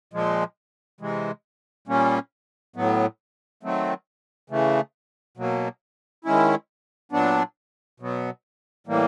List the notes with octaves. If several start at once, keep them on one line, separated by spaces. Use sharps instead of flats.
A#2 F3 G#3
C3 E3 G#3
A#2 G3 A#3 C#4
A2 F#3 B3
D#3 F#3 A3 C4
C#3 E3 A3
B2 F#3 A#3
D#3 G#3 C#4 E4
A#2 F#3 B3 D4
B2 F#3 B3
A2 E3 G3 A#3